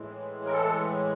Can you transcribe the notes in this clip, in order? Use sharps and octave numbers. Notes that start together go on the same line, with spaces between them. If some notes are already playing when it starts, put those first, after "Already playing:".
Already playing: A2 E3 G#3
A#4
A4